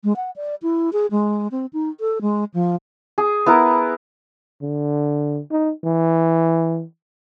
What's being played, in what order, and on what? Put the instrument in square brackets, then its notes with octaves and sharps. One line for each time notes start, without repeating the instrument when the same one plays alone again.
[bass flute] G#3
F#5
D5
E4
G#4
G#3
C4
D#4
A4
G#3
F3
[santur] G#4
B3 E4 A#4
[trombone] D3
D#4
E3